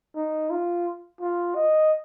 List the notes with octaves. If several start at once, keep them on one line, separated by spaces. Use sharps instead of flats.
D#4
F4
F4
D#5